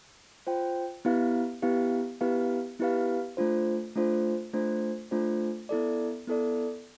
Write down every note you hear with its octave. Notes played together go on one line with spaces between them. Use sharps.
F4 C5 G5
B3 E4 G4 B4 F5
B3 E4 G4 B4 F5
B3 E4 G4 B4 F5
B3 E4 G4 B4 F5
A3 D4 F4 C5
A3 D4 F4 C5
A3 D4 F4 C5
A3 D4 F4 C5
B3 E4 A4 D5
B3 E4 A4 D5